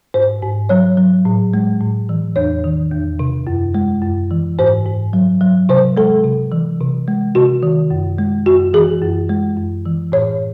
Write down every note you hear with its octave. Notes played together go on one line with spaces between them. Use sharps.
G#2 C5
G#2
F#3 C#5
F#3
A2
G#3
A2
E3
E2 C#5
D#3
E2
C3
F#2
G#3
F#2
E3
G#2 C5
G#2
F#3
F#3
C3 C5
G#3 A4
C3
E3
C3
G#3
C3 F#4
D#3
F#2
G#3
F#2 F#4
E3 G#4
F#2
G#3
F#2
E3
A2 C#5